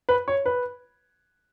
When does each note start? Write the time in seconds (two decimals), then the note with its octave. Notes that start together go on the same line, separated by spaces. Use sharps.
0.09 B4
0.28 C#5
0.46 B4